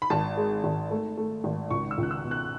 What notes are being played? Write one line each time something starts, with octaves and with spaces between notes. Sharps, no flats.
B5
G#1 A5
G#3
G#1
A3
A3
G#1
C#2 C#6
E6
C#2
F#6
E6
B2
F#6